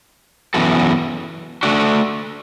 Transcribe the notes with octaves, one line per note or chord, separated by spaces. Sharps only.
F#2 E3 B3 F#4 A4
A3 D4 F#4